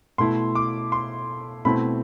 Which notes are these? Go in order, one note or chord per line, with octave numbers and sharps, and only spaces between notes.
B2 A3 E4 C6
D6
C6
B2 A3 C4 E4 B5